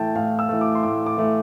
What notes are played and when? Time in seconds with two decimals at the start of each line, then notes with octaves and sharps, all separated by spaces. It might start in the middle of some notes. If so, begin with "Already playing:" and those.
Already playing: A2 E3 A3 G5 A5
0.15 A2 F5
0.39 E6
0.49 E3 A3
0.61 D6
0.75 C6
0.83 A2 D6
1.06 D6
1.17 E3 A3